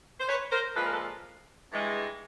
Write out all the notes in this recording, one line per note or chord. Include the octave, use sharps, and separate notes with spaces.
C5
B4 C#5
A#4 C5
A#2 F3 G#3 A4 B4
A#4
A4 B4
G2 E3 G#3